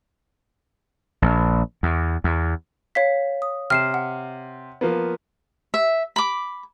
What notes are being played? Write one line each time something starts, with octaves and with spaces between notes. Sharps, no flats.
A#1
E2
E2
C#5 F5 B6
D#6
C3 F6 C7 E7
F#5
F3 A#3 B3
E5
B5 D6